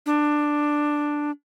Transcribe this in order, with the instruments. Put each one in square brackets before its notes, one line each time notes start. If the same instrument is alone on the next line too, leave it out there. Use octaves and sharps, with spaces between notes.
[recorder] D4